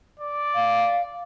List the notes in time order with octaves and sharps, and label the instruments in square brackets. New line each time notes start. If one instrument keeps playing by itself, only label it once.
[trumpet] D5
[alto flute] F5